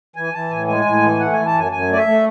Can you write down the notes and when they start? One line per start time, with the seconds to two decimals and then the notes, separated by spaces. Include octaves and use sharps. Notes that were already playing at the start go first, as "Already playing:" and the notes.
0.16 E3 G#5
0.34 E3 A5
0.50 A2 G#5
0.68 G#3 G#5
0.85 A2
1.03 E3
1.19 A3 F#5
1.33 E3 G#5
1.46 A5
1.54 F#2 G#5
1.72 F#2 G#5
1.89 A3 D5
1.98 E5
2.06 A3